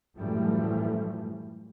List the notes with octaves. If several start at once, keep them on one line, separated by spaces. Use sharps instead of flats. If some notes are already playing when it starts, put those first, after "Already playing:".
F#2 A2 E3 F3 G3 A3